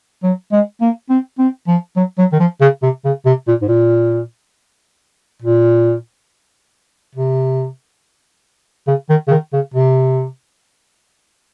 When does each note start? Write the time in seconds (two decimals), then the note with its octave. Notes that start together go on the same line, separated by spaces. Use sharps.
0.23 F#3
0.52 G#3
0.81 A#3
1.10 C4
1.39 C4
1.68 F3
1.97 F#3
2.18 F#3
2.32 D#3
2.40 F3
2.61 C#3
2.83 C3
3.05 C#3
3.26 C3
3.48 A#2
3.62 G#2
3.69 A#2
5.42 A#2
7.15 C3
8.88 C#3
9.09 D#3
9.27 C#3
9.31 D#3
9.53 C#3
9.74 C3